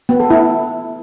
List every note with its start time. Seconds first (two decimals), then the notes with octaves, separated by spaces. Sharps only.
0.09 B3
0.20 A4
0.30 E4